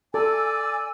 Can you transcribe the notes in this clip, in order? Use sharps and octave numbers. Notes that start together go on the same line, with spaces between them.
A4 D5 G#5 E6